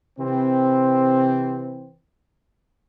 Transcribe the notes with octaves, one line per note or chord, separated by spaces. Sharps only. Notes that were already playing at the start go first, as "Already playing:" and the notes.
C3 E3 C4